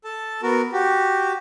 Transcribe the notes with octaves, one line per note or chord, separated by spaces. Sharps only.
A4 A5
B3 F#4 A#4
F#4 G4